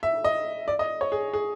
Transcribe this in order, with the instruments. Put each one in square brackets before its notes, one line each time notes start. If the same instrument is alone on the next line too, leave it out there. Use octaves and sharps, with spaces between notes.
[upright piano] E5
D#5
D5
D#5
C#5
G#4
G#4